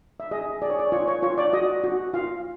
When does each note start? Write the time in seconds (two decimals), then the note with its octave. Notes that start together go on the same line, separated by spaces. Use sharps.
0.20 E5
0.31 G#4 D#5
0.62 G#4 D5
0.70 C#5
0.79 D5
0.92 F4 C#5
1.08 C#5
1.23 F4 C#5
1.38 D5
1.53 F#4 D#5
1.84 F#4
2.14 F4 F5